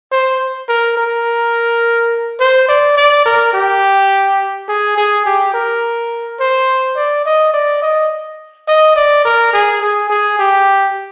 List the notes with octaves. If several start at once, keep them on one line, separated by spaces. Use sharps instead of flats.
C5
A#4
A#4
C5
D5
D5
A#4
G4
G#4
G#4
G4
A#4
C5
D5
D#5
D5
D#5
D#5
D5
A#4
G#4
G#4
G#4
G4